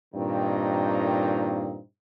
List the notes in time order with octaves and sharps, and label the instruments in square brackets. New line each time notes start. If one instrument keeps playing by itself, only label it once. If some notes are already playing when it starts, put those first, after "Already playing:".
[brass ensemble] G2 A#2 D#3 A#3 C4 D#4